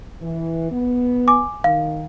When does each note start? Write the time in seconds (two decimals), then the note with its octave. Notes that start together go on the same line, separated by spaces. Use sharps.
0.21 E3
0.71 B3
1.28 G#5 D6
1.64 D#3 F5